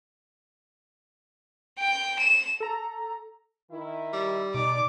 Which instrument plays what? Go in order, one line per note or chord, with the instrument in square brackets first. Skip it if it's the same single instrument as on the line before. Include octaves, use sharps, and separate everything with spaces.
[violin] G5
E7
[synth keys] A4 A#5
[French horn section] D#3 E4
[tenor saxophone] G3
[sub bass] B2 [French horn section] D#4 D5 [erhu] D6